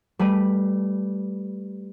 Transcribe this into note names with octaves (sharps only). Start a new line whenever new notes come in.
G3 A3 B4 B5 D#7